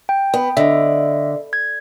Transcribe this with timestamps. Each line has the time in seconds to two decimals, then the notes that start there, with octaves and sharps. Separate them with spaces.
0.09 G5
0.34 B3
0.57 D3 D#5 E5
1.53 G#6